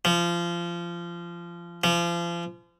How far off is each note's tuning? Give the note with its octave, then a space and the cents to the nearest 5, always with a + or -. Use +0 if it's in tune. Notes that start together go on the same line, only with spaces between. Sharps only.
F3 -25
F3 -35